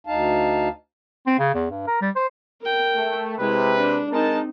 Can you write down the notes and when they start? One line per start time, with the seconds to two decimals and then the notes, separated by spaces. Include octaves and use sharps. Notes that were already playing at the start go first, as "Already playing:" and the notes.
0.07 D2 D#4 F5 A5
1.27 C4
1.39 C#3
1.54 E2
1.71 G2
1.87 A#4
2.01 G3
2.16 C5
2.61 A#4 G5
2.96 A3
3.39 C3 G#3 E4 B4
3.76 D4
4.12 G#3 C4 D#4 A#4 A5